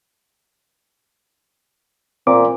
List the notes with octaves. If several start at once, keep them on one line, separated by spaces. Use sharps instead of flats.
A#2 C4 D6